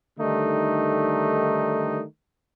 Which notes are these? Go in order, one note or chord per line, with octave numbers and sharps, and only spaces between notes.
D3 D#3 G3 A3 D#4